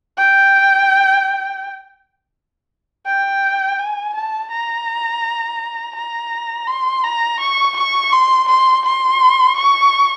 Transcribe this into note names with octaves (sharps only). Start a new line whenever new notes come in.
G5
G5
G#5
A5
A#5
A#5
C6
A#5
C#6
C#6
C6
C6
C6
C#6